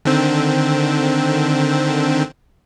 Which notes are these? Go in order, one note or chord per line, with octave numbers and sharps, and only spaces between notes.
D3 D#3 C4